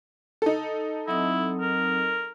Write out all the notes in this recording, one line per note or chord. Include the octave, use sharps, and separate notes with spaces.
D#4 A4
F#3 C4 E4 D#6
A#4